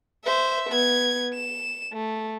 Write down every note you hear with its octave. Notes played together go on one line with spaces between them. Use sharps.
C5 E5
B3 G#6
E7
A3